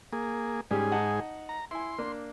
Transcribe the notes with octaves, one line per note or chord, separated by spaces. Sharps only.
A#3 G#4
G#2 G3 C#4 G4 G#4
D#4 F#5 A5
A#5
E4 G#5 C6
A#3 D4